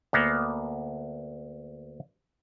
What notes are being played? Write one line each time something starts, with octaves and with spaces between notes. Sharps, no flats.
D2 A#3 B3